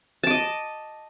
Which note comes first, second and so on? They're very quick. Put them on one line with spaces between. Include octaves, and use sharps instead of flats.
A5 D6 D#5